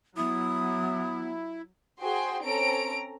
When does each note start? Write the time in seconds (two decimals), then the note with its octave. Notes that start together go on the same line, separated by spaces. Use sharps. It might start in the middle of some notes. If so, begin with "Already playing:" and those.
0.17 F#3 B3 E4 D#6
2.01 F#4 G#4 C5 G5 C6
2.43 C4 C#4 A4 A#5 D7